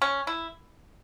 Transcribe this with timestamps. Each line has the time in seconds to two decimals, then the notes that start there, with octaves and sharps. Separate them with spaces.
0.02 C#4
0.27 E4